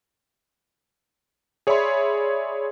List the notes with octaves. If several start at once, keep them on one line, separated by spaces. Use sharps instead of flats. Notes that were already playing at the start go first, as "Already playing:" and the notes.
G#4 C#5 D5 E5 B5 C6